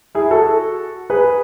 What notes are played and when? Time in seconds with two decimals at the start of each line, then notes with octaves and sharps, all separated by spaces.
0.15 E4 G#4
0.31 F#4 A4
1.10 G#4 B4